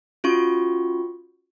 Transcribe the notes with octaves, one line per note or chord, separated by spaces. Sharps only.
C#4 F4 F#4 C#6